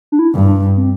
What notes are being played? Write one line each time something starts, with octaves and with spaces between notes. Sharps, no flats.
D4
E4
G2
D4
C4